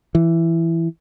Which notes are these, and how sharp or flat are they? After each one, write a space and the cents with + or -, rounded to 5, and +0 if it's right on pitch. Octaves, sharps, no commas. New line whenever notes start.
E3 +10